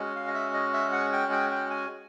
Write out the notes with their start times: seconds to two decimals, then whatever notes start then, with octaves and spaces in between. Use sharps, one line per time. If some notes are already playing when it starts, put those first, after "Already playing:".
Already playing: G#3 C#4 F#4
0.16 F5
0.28 D#5
0.34 E5
0.54 D#5
0.74 E5
0.93 F#5
1.13 G5
1.32 G5
1.52 G5
1.70 G#5